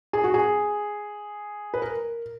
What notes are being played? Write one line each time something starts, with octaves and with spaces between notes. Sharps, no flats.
G#4
F#4
G#4
B4
A#4